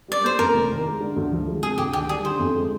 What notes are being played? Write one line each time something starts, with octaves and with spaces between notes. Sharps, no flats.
G3 D5
A#3 C5
F2 A#4
F1
D#3
G#3
D3
D2
F3
G#3
C3 G#4
D2 G4
D#3 G4
G3 G#4
D3 C5
F2
G#3